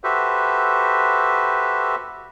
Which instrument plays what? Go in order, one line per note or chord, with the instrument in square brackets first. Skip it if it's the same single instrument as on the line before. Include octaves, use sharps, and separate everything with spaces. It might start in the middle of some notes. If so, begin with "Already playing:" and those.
[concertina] F#4 G4 A4 B4 C5 E5